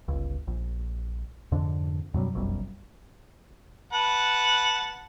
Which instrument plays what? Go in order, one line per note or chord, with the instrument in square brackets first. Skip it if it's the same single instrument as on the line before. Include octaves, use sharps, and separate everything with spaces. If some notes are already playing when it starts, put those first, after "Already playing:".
[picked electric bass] G1 C#2
A#1
F2 G#2 D3 D4
F#2 B2 F#3 G3
F1 B1 F#2 G3
[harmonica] B4 F#5 A5